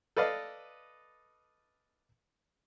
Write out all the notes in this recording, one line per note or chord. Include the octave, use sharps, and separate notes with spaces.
A4 B4 D5 D#5 F5